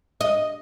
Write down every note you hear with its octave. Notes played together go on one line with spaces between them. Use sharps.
D#5